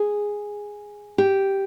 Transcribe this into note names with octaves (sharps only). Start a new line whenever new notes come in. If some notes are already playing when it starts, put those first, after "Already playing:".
Already playing: G#4
G4